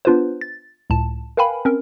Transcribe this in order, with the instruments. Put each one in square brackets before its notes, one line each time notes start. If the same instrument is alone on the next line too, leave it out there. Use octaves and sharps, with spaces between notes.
[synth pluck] B3 D4 F4 B4 C5
A6
C#2 A2 A5
A#4 B4 F5 G5 G#5 B5
C4 C#4 A#4